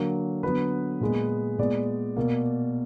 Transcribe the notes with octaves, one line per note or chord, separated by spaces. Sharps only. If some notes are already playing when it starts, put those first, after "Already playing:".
Already playing: D3 F#3 A#3
D3 F#3 B3 B4
A#2 G#3 B3
A#2 G#3 B3 D5
B2 A#3